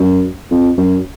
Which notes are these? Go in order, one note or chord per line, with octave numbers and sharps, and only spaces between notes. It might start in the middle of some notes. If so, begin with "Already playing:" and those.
Already playing: F#2
F2
F#2